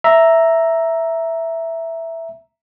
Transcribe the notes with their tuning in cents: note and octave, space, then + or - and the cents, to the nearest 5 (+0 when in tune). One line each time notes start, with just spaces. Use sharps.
E5 +0 A#5 +0